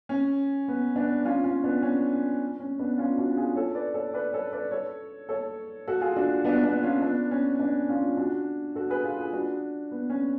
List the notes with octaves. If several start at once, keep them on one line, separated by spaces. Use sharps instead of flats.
C#4
B3
B3 D4
C#4 F4
C#4 F4
B3 D4
C#4
C#4
B3 D4
C#4 F4
D4 F#4
F4 G#4
A4 C#5
B4 D5
A4 C#5
B4 D5
A4 C#5
B4 D5
A4 C#5
A4 C#5
F#4 A4
F4 G#4
D4 F#4
B3 D4
B3 D4
C#4 F4
B3 D4
C#4
B3 D4
C#4 F4
D4 F#4
F#4 A4
G#4 B4
F4 G#4
F4 G#4
D4 F#4
B3
C#4